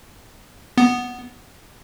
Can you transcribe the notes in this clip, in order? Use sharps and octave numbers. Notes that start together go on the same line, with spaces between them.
B3